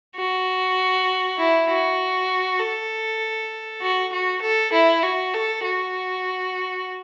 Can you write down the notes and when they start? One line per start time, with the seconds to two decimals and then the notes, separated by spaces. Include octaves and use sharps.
0.16 F#4
1.38 E4
1.68 F#4
2.59 A4
3.82 F#4
4.12 F#4
4.42 A4
4.72 E4
5.03 F#4
5.34 A4
5.64 F#4